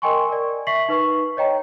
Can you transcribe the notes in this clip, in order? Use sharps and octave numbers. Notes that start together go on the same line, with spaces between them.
A#4 D#5 G5 G#5 C6 C#6
A#4 D5
E5 C#6 B6 C7 F#7
D#4 B4 C#6
C#5 D#5 G5 A#5